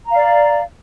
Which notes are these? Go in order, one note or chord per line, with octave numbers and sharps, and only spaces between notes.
D5 F5 A#5